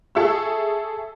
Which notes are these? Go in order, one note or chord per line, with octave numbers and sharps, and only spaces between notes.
G#4 A4 E5 C#6 E6